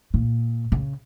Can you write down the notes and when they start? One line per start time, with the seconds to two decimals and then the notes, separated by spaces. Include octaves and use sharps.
0.14 A#2
0.72 C#3